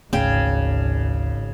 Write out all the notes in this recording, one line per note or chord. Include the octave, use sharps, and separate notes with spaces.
G#1 D2 C#3 G5